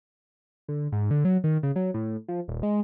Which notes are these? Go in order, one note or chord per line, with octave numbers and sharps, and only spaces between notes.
D3
G#2
D3
F#3
D#3
C#3
F#3
A2
F3
D#1
G#3